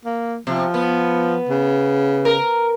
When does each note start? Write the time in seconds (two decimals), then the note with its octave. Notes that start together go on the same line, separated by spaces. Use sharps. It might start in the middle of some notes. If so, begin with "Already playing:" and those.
0.05 A#3
0.47 C3 F3
0.74 B3
1.49 C#3
2.25 A#4